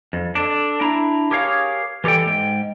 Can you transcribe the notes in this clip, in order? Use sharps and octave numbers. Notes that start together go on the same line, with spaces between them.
F2
D4 A4
D4 E4 A#5
G4 G#4 A#4 C#5 F5
E3 G4 A4 D5 G5
G#2 G#3 G5